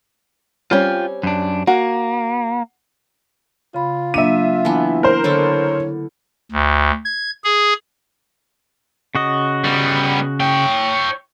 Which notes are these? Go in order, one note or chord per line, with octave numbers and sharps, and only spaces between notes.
G3 C4 C#4 F4 G5
F#2 D4
A#3 F#4
C#3 F4 B5
F#3 A#3 D4 E5 D#7
E3 B3 D4 A5
A#4 C5
D3 E4 A4 C#5
D2
G#6
G#4
C#3 F#4 D#5
G3 B3
C#5 G5